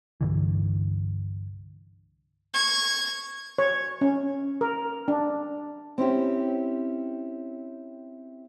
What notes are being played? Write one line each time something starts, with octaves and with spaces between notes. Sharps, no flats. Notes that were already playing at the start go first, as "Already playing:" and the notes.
C2 G2 D3 E3
C#6 G#6
C#5
C#4
A#4
D4
C4 C#4 E4 G4